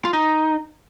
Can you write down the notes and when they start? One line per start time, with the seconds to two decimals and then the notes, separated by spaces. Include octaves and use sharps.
0.05 F4
0.13 D#4